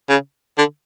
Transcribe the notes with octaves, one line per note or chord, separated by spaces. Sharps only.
C#3
D3